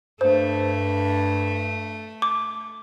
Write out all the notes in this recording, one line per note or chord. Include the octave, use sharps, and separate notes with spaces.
G2 A3 C5
D6